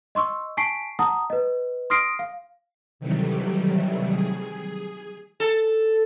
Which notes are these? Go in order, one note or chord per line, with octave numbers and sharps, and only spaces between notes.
D#5 C6 C#6 E6
G#5 A5 C#6 B6 C7 D7
F#5 A5 A#5 D#6
B4 D#5
C6 D#6 F6 A#6 C7 D7
F5
C3 D#3 E3 F#3 G3 A3
G#4
A4